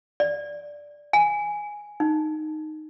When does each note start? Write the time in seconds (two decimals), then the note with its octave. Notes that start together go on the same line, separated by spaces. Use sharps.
0.20 D5
1.13 G#5
2.00 D#4